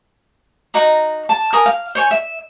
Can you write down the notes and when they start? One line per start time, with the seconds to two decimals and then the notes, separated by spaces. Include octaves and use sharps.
0.74 D#4 F#4 A#5
1.29 A5
1.53 A#4 G#5 D#6
1.66 F5
1.95 C5 C#5 G#5
2.11 E5